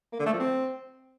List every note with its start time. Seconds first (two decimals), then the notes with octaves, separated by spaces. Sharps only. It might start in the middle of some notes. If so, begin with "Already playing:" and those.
0.13 A#3
0.19 D3
0.26 A3
0.33 F3
0.40 C4